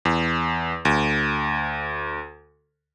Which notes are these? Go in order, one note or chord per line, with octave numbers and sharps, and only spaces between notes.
E2
D2